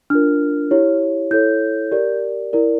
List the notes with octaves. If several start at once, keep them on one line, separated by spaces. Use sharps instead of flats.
D4 F4 A#4 F6
E4 G4 C#5
E4 A4 C#5 G6
G4 A#4 D5
E4 A#4 D5